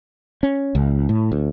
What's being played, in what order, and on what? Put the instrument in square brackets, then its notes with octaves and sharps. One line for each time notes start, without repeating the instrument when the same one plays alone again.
[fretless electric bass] C#4
C#2
A2
D2